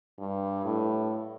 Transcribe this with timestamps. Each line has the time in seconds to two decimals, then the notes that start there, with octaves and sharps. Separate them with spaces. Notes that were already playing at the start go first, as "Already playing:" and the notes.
0.19 G2
0.65 A2